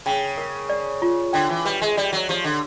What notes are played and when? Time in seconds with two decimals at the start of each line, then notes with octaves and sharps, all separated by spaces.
0.06 C#3 G5
0.38 A#4
0.69 D5
1.02 F4
1.33 D3 G5
1.49 E3
1.65 G3 B4
1.82 G#3
1.97 G3 D5
2.13 F#3
2.29 F3 G4
2.44 D3